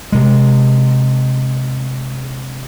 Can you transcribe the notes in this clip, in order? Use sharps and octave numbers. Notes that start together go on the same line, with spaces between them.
C3 G#3